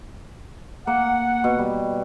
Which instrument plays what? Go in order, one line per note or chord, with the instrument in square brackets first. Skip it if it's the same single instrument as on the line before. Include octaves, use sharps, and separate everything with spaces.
[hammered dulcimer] A#3 [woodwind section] F#5
[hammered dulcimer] B2
G3